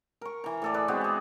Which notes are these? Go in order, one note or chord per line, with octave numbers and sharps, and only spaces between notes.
A#4 C#6
E3 A#5
A2 A4 D5
G#4 B4 D5
G#3 B3 C4 F#4
E4 G#4